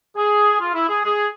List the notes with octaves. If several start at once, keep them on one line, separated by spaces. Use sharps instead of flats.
G#4
F4
E4
G#4
G#4